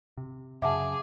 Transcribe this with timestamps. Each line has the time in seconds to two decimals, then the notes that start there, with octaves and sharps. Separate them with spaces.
0.17 C3
0.62 F#2 C#3 G#4 E5 F#5 A5 D6